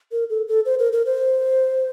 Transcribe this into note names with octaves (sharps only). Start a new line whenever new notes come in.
A#4
A4
A4
C5
A#4
A#4
C5